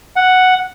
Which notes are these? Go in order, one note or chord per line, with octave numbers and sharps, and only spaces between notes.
F#5